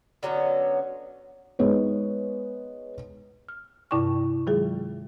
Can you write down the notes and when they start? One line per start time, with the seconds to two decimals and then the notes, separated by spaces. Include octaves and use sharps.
0.23 D3 F#3 B3 C#4
1.59 G#3 B3 D#4 C#5
3.49 F6
3.91 G2 C3 E4 D5 G5 C#6
4.47 D#3 F#3 G#3 F4 G#4